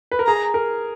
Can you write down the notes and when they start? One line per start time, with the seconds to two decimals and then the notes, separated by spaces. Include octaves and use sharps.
0.12 B4
0.19 A#4
0.27 G#4 A#5
0.54 A#4